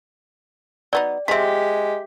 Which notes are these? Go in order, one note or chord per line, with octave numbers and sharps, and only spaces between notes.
F#3 B3 D#4 D5
F3 G#3 C4 G4 E5 B6